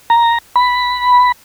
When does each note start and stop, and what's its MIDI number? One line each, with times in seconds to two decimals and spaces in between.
0.10 0.38 82
0.56 1.32 83